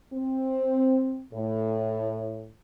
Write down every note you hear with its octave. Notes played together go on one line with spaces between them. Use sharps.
C4
A2